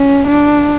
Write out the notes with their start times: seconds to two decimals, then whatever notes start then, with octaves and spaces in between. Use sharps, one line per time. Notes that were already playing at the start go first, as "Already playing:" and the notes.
Already playing: C#4
0.27 D4